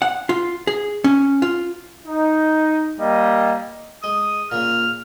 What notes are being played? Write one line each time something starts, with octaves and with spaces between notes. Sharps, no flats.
F#5
F4
G#4
C#4
F4
D#4
G3 A#3 D#5
G#3 D#6
A#2 C#3 F6